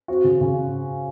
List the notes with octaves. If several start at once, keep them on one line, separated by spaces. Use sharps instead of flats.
C4 F#4
C#3
C#3